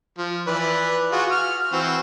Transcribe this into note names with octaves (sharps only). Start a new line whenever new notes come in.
F3
E3 B4 D5
F4 F#4 G#4
F6
E3 C4 F#4